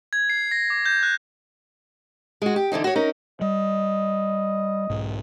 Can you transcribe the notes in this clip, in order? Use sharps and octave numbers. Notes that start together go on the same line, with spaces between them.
G#6
C7
A#6
D6
G6
F#6
G#3 F#4
G4
D3 E3 F3 D#4
F#4 C#5
C#4 D#4 A#4
G3 D#5
B1 G#2